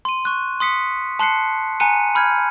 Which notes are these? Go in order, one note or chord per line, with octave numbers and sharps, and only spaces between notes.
C6 D#7
C#6 F#6
C6 D#6 B6 C#7
A5 C6 F#6 C7 C#7
G#5 A#5 F#6 C#7 D#7
B5 F6 G6 G#6